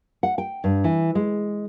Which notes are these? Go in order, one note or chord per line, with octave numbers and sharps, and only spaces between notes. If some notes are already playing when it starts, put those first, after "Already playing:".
F#5
G5
G2
E3
G#3